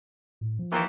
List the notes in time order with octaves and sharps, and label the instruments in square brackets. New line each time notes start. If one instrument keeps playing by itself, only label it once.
[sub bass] A2
F3
[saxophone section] D#2 E3